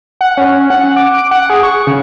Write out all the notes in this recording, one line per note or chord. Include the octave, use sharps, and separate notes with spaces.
F#5
C#4
F#5
D6
D7
F#5
G#4
C#6
C#3